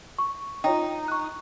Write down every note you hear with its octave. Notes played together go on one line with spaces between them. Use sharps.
C#6
D#4 F4 C#5 G5
C#6 F#6